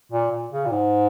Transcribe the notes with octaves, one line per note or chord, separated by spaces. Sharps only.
A#2
A#2
C#3
A#2
G#2